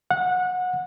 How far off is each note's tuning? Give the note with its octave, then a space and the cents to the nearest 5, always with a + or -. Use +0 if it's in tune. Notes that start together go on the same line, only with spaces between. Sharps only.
F#5 -25